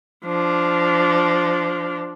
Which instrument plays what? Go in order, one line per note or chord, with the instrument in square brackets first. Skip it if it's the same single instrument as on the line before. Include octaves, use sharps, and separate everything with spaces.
[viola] F3 D4